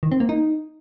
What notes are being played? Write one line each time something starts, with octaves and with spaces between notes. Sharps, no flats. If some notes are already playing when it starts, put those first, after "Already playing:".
D#3
C4
A#3
D#4